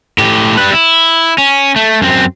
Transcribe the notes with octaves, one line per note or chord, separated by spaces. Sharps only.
A2 G4
G3 B4
E4
C#4
A3
F#2 C4